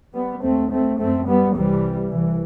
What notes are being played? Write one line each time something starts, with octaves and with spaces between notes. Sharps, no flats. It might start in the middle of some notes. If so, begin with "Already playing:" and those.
G3 B3
D#2 A3 C4
A3 C4
F#2 A3 C4
G3 B3
C2 C3 E3 G3
C2 E3